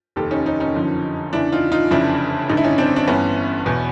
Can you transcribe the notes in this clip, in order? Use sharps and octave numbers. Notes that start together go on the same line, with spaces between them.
F1 D#2 D#3 G4 A4
C#4 D#4
C#4 D#4
C#4 D#4
F#1 F2 D3 F3
E2 C#3 E3 D4 E4
D#4 F4
D#4 F4
F1 F2 C#3 E3 D4 E4
A1 G2 D3 D#4
E4
C#4 D#4
C4 D4
D4
G1 G2 E3 B3 C#4
E2 B2